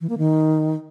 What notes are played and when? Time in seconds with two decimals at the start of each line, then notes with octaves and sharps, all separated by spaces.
0.01 E3
0.09 A#3
0.18 D#3